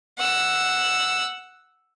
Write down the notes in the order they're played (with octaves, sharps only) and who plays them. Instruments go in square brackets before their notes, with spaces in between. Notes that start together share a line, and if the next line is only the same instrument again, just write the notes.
[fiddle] F#5 E6